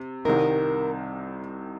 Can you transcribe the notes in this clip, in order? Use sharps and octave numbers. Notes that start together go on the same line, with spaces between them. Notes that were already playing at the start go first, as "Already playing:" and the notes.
Already playing: C3
C2 C3 D#3 A#4